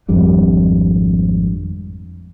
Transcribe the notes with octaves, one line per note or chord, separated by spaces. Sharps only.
G#1 F2 G3 D4